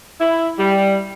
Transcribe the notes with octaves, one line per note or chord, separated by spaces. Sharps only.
E4
G3